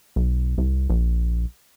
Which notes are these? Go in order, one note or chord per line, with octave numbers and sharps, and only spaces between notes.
B1
C2
A#1